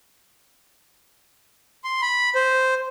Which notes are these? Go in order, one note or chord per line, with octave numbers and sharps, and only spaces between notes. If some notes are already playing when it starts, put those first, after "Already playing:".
C6
B5
C5